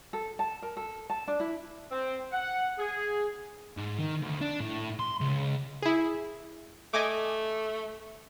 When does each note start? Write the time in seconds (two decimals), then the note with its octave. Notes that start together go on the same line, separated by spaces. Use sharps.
0.13 A4
0.39 A5
0.62 A#4
0.77 A4
1.10 A5
1.27 D4
1.40 E4
1.91 C4
2.33 F#5
2.78 G#4
3.77 G#2
3.99 D#3
4.22 D2
4.41 D4
4.61 A2
5.00 C6
5.21 C#2
5.82 E4 G#4
6.94 A3 D#5 G#5 D6